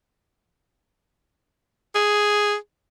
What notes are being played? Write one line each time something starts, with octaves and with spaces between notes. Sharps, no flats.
G#4